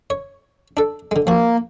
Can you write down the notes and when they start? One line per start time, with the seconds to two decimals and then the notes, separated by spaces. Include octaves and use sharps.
0.10 C#5
0.77 D4 A4
1.11 D3 G#3
1.27 F3 A#3 F#4